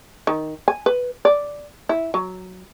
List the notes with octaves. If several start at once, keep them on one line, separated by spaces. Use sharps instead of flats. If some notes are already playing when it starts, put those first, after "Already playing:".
D#3
G#5
B4
D5
E4
F#3